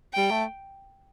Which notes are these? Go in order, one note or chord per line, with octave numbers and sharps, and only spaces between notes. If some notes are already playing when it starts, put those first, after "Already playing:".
G3 G5
A3